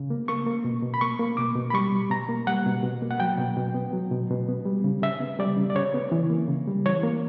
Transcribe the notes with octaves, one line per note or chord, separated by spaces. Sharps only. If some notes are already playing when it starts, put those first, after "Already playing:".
Already playing: C#3
A#3
A#3 C#6
A#3
B2
B2
B5
A#3 C#6
A#3
B2 D6
B2
B5
G3 C#6
B2
B2 A#5
A#3
G3 F#5
B2
B2
A#3
F#5
F#3 G5
B2
B2
B3
F#3
B2
B2
B3
G3
C#3
C#3 E5
B3
G3 D5
C#3
D5
C#3 C#5
B3
E3
A#3
C#3
G3
E3 C#5
A#3